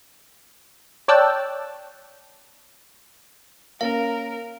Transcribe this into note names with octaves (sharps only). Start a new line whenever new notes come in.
C#5 D5 G5 A5 E6 F#6
A#3 C#4 A#4 F5